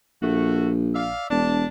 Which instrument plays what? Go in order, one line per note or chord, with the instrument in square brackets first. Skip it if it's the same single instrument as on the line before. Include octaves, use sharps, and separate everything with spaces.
[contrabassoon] A#1 [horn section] A3 F#4
[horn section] D5 E5 F5
[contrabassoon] E1 [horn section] D4 A5